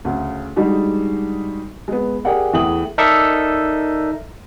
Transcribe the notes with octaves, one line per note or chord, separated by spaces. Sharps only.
D2 C#3
G3 G#3 D4 D#4 F#4
G#3 B3
G4 G#4 A#4 D5 F#5 G5
E2 E3 A3 G5 D#6 F#7
D#4 A4 A#4 D5 E5